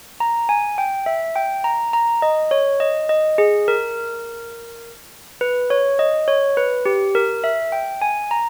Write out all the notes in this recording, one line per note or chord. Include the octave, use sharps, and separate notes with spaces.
A#5
G#5
G5
E5
G5
A#5
A#5
D#5
C#5
D#5
D#5
G#4
A#4
B4
C#5
D#5
C#5
B4
G4
A#4
E5
G5
G#5
A#5